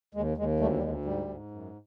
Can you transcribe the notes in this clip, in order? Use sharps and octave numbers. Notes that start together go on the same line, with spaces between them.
D#2 G#3
D#2 G#3
D2 G3 A3
G3
D2 G#3
G#2 G3
G#2
F#2